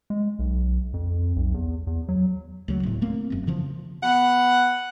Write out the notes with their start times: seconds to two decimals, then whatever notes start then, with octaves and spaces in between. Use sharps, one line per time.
0.10 G#3
0.39 B1
0.94 F2
1.36 B1
1.54 E2
1.87 E2
2.09 F#3
2.68 D2 C#3 F#3
2.83 E1 A2
3.01 A3 A#3 C4
3.30 E1 F#2
3.47 C#3 E3 F3
4.03 B3 F#5